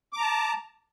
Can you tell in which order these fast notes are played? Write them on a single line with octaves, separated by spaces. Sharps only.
D6 A#5 A5